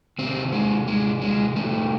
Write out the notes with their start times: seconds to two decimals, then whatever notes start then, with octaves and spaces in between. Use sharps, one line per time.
0.19 C3 D#3 C4
0.53 G#3
0.87 G#3
1.21 G#3
1.56 C3 D#3 A3